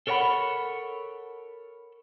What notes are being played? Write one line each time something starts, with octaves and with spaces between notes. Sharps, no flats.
A4 A#4 C#5 D5 F#5 B5